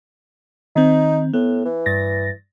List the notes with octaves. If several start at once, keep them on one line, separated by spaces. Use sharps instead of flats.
D#3 C4 D#4
A2 B3
E3
G2 A6 A#6